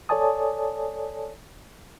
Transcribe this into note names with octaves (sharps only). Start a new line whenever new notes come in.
A4 C#5 D5 G#5 A5 D#6